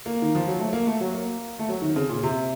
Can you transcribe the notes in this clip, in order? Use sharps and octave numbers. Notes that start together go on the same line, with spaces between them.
A#3
D#3
F3
F#3
A3
A#3
A3
F#3
A#3
A3
F#3
D#3
C#3
A#2
C3